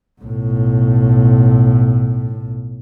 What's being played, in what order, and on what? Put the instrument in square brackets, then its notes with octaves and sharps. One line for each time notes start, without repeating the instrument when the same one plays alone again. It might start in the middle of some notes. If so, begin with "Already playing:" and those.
[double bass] B1 A2